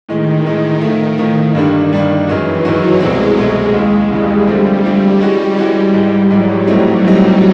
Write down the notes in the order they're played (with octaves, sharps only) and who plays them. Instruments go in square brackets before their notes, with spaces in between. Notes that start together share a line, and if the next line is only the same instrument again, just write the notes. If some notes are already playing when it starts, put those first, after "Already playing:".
[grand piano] A2 E3 G#3 [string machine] D#3
[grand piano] A2 E3 G#3
[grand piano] A2 F3 A3 [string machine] D#3
[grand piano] A2 F3 A3 [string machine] D#3
[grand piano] G2 D3 G3 A#3 D4
G2 D3 G3 A#3 D4
[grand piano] F#2 D#3 G#3 C#4 F#4 [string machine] E3
[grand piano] F#2 D#3 G#3 C#4 F#4 [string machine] F#3
[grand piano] C2 B2 F#3 A3 C4 [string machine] G#3
[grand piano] C2 B2 F#3 A3 C4 [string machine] G#3
[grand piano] D#2 C#3 E3
[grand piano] D#2 C#3 E3 [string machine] G3
[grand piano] D3 F3 A3 C4
D3 F3 A3 C4
[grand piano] E3 G#3 C#4 F#4 [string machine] G3
[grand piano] E3 G#3 C#4 F#4
[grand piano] G#2 E3 G#3 [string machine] G3
[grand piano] G#2 E3 G#3 [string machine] F#3
[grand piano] A2 E3 A3 C4 D#4
A2 E3 A3 C4 D#4